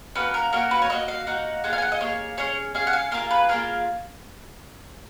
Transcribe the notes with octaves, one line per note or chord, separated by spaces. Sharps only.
A#3 C#4 F#4 B4
A#4
A#3 C#4 F#4 A#4
B4
C#5
A#3 D#4 F#4 D#5
F5
A#3 D#4 F#4 F#5
A#3 F4 G#4 F#5
F5
G#5
F#5
D#5
A#3 F4 G#4 C#5
C#4 G#4 C#5
C#4 G#4 F5
F#5
F5
A#3 F4 G#4 A#4
B4
A#3 F4 G#4 A#4